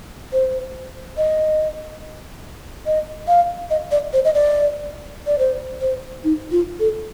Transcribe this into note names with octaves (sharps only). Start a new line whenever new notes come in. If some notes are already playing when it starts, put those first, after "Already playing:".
C5
D#5
D#5
F5
D#5
D5
C5
D#5
D5
D5
C5
C5
D#4
F4
A4